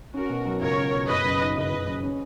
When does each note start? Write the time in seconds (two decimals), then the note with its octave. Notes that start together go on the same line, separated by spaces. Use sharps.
0.14 C#4 F#4 A#4
0.30 B2
0.45 F#3
0.61 C#2 A#4 C#5
0.77 C#4
0.93 B2
1.08 F#1 B4 D#5
1.24 F#2
1.40 D#3
1.55 F#1 B4 D#5
1.72 F#1
1.87 F#2
2.03 C#4